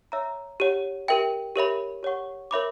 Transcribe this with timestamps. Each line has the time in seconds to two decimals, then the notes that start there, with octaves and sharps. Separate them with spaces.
0.12 C#5 E5 A#5 E6
0.60 G4 C#5 F#5
1.08 G4 A#4 E5 G5
1.56 G4 A#4 C#5 E5 B5
2.03 G4 C#5 F#5 C#6
2.51 A#4 C#5 E5 B5 D6